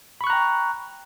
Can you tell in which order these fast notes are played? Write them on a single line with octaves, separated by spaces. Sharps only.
B5 C#6 F#6 A#5 G5